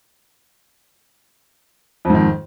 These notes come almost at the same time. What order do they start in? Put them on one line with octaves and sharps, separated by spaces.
F2 G#2 D#3